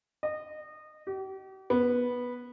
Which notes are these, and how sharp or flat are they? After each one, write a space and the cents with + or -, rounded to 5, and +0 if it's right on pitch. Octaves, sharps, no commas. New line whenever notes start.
D#5 -25
G4 -40
B3 -10